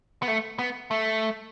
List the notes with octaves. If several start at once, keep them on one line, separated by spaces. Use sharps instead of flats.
B3
A3
B3
A3